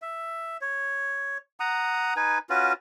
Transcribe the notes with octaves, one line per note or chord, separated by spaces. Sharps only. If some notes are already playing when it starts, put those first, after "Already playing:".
E5
C#5
F#5 A#5 D#6
D#4 B4 G#5
C#4 F4 F#4 B4